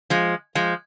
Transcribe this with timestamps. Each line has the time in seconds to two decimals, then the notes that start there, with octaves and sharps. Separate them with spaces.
0.10 F3 G#3
0.55 F3 G#3